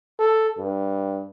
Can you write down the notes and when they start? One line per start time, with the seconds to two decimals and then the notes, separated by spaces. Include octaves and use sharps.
0.19 A4
0.58 G2